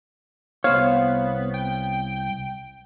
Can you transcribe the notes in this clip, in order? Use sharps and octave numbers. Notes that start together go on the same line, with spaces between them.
C2 B3 C5 C#5 F5
G5